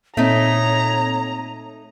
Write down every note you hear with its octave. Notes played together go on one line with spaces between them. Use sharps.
A#2 A3 C4 D#4 C#5 A#5